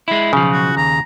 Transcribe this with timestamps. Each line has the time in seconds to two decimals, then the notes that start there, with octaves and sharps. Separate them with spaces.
0.08 G#3 E4
0.33 B1 C#3 F3
0.52 F#4
0.77 D#2 A#5